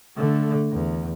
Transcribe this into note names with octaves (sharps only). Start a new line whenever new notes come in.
D3 A3
E2